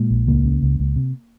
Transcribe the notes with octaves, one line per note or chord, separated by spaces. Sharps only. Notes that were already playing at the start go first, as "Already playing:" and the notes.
Already playing: A#2 G#3
A#1
C#2 A#3
C#3
C#2
C#2
C3